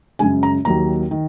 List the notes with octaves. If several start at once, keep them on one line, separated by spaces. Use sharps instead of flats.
F#2 C#3 G#3 G#5
A#5
D#2 D#3 F#3 A#3 A#5
D#3